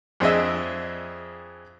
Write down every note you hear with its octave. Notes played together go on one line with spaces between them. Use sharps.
F2 C4 D4 G#4 D#5 E5